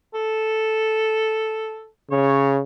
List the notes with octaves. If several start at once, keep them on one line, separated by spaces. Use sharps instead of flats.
A4
C#3 C#5